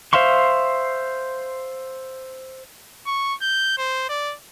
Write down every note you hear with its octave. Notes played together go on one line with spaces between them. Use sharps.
C5 E5 F5 C6 C#6
C#6
G6
C5
D5